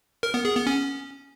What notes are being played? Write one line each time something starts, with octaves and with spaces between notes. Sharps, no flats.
A#4
B3
G#4
B3
C#4